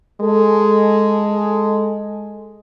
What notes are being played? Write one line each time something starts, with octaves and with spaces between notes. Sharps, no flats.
G#3 A4